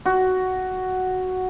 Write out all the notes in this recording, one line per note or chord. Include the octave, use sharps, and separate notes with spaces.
F#4